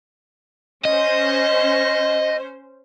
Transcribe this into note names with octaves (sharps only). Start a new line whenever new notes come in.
C#4 C5 D#5